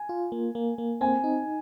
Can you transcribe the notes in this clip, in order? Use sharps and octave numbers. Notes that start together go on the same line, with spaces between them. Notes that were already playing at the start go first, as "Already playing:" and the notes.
Already playing: G#5
F4
A#3
A#3
A#3
C4 G#5
D#4